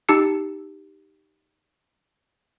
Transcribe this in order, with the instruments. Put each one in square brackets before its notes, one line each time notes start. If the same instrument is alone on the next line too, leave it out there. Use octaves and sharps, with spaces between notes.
[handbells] D#4 G4 A5 E6 C#7